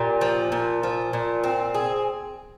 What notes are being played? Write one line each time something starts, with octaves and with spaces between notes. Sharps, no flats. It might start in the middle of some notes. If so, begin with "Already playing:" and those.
Already playing: A#2 G4
F3
A#2
F3
A#2
C4
G#4